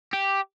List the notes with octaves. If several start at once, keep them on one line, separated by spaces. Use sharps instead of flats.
G4